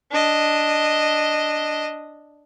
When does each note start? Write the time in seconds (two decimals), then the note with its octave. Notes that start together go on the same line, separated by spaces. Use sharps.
0.11 D4 D#5